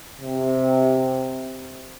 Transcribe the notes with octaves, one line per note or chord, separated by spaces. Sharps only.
C3